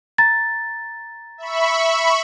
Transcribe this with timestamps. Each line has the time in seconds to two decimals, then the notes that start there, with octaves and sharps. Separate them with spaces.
0.18 A#5 A6
1.38 E5 B5 C#6